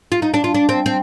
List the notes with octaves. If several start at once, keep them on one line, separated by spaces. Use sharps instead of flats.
F4
D#4
D4
F4
D4
C4
C4